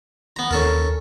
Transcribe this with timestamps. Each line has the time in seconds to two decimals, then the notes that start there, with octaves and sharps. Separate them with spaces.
0.36 B3 A#5
0.51 D#2 C#4 A4 A#4